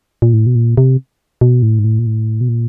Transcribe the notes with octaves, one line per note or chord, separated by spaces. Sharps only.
A#2
A2
B2
A#2
C3
B2
A2
G#2
A2
A#2
A2
B2
A#2